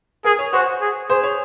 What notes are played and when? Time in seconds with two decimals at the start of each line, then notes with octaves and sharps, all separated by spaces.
0.24 G#4 A#4
0.39 C#5
0.53 F#4 C5
0.81 G#4
1.09 G#4 C5
1.23 C#5